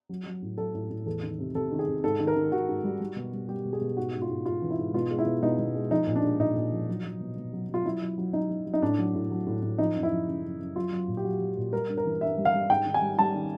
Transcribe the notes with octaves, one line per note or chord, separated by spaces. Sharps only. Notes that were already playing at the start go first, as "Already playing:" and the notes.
F#3
F#3
A2
F#3 A4
A2
A2
E2 A4
D#3
C3
C3 A4
D#3
G#4
C3
G#2 A4
D#3
A#4
D#3
D#3 F#4
G#2
G3
G3
B2
G3
G3 G4
B2
G#4
B2
G#2 F#4
G#2
F4
G#2
G#2 F4
E3
E4
G#2
B2 F4
G#3
E4
B2
B2 D#4
B2
G#3
F3 D#4
A#2
D4
G#3
A#2 D#4
A#2
F3
F#3
F#3
B2
B2
F#3
F#3 F4
F#3 E4
F#3
F#3
F#3 D#4
F#3
F#3
D#4
A2 D4
F#3
A2
F#3
A2
A2
F3 D#4
F#2
E4
F3
C#3
F#2
F#2
F#3 F4
F#3
A#2
G4
F#3 F#4
F#3
A#2
G3 A#4
G2
A#4
E3
G2 E5
G3
F5
G3
G#2 G5
D#3
G#5
G3
G3 A5
D#3